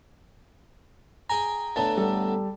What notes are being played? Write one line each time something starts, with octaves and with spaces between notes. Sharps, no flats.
G#4 G5 G#5 A#5
A2 D3 B3 A5
G3 A4